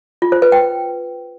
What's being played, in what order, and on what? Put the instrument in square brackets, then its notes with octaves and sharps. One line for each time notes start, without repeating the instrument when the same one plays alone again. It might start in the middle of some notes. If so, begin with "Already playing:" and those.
[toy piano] F4
C5
B4
G5